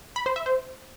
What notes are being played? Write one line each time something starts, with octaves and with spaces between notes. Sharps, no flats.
B5
C5
E5
C5